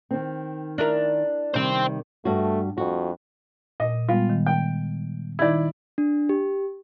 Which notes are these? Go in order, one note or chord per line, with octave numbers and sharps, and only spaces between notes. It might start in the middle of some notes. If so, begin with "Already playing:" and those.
D#3 C4
D4 E4 A#4
C3 D#3 G3 C5 G5
G2 A3 F#4
F2 F#4
A#2 D#5
G3 G#3 B3 F4
D#3
G5
D#3 D#4 E4 D5 G#6
D4
G4